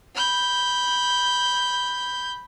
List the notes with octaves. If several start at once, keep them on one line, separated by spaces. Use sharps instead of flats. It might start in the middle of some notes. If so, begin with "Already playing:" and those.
B5 G6